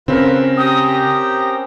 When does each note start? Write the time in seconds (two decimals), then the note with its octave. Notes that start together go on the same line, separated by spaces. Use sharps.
0.08 C#3 C4 C#4 F4 A#4 B4
0.57 G4 G5 A#5 D#6